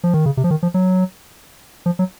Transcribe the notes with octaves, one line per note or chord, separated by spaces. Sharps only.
F3
D#3
C#3
C3
F3
D#3
F3
F#3
F3
F#3